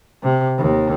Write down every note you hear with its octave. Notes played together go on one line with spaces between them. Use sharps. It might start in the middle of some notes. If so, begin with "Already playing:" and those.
C3
D#2